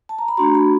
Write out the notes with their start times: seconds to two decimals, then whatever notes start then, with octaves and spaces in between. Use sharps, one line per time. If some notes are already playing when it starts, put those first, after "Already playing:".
0.09 A5
0.18 A#5
0.28 B5
0.37 A3 D4 F#4 A#5 C6
0.55 A5 B5